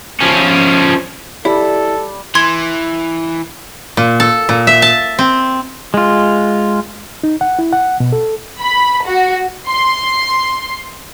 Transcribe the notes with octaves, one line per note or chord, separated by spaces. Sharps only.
F3 C#4
G3 E4 A4
E3 C6 G#6
A#2
A4
A#2
E5
A5
C4
G#3 F4
D#4
F#5
E4
F#5
B2
A4
B5
F#4
C6